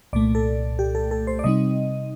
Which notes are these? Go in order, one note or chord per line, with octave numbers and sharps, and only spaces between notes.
C2 A#2 A3 D5
A4
G4
A4
A4
C5
D5
C3 G3 C4 D#4 D#5